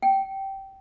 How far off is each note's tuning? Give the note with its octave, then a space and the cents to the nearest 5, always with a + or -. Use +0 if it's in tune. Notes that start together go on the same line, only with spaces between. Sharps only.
G5 -15